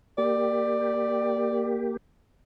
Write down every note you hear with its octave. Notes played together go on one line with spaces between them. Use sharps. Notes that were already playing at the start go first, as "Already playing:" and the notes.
A#3 G4 D5